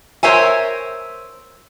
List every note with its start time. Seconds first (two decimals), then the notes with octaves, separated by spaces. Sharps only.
0.23 A#4 C5 C#5 E5 G#5